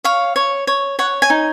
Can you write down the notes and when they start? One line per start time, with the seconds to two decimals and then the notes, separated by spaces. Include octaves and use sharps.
0.04 C#5 F5
0.36 C#5
0.67 C#5
0.99 C#5 F#5
1.22 G#5
1.30 D#4